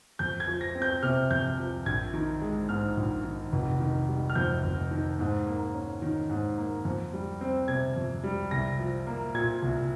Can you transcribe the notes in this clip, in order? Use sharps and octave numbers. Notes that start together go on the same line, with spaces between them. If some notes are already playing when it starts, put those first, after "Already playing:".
F2 G6
G#6
F3
A#6
C4
G6
C3 F6
F2 G6
F3
A#1 G#6
D#3
G#3
G#2 F6
A#1
D#3
F1
D#3
G3
F6
F2 G6
F1
D#3
G#2
A#3
C#4
D#3
G#2
A#3
F2
G3
C4
C3 G#6
F2
G3
C2 A#6
F3
A#3
A#2 G#6
C2